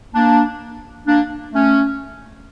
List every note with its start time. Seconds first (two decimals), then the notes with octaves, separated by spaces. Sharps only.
0.14 A#3 D4
1.07 A#3 D4
1.53 A3 C#4